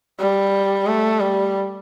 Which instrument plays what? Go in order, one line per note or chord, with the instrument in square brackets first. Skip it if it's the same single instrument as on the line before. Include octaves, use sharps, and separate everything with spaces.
[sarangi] G3
A3
G3